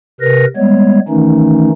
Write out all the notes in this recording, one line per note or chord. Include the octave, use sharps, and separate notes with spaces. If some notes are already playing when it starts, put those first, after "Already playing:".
C3 A#4 B4 A#6
G3 G#3 B3 C#5
D#3 E3 A3 C#4 D#4